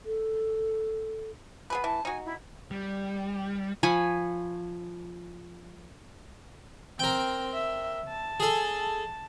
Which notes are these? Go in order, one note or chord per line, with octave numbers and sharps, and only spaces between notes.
A4
B3 G#4 B4
E3 A5
D#4 F#4 G#5
E4
G3
F3 G#5 B5 C#6
C4 A#4 G5
E5
A5
G#4 A4